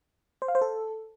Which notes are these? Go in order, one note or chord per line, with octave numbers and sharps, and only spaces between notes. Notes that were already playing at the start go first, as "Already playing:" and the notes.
C5
F5
C5
A4